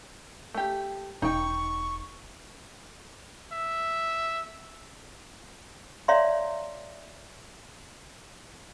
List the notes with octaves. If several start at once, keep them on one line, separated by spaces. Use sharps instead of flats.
A3 G4
E1 D#4 G5 C#6
E5
C#5 D5 E5 F5 A#5 C6